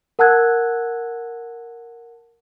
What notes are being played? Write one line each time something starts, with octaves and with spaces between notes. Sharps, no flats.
A#4 F#5 A5 E6 F#6 G#6